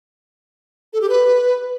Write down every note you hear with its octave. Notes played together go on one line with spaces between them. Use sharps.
A4
G4
B4